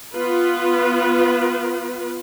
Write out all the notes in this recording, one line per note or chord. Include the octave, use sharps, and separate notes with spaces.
B3 F4 B4